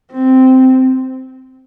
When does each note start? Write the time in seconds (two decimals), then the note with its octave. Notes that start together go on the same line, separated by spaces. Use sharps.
0.12 C4